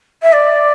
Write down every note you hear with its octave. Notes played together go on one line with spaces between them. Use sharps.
E5
D5